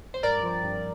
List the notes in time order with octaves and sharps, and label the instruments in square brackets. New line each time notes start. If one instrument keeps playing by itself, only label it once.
[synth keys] C5
G2 A#4 D5
F3 C4
G2